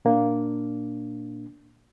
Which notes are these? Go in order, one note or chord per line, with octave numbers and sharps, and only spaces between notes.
A#2 A#3 D4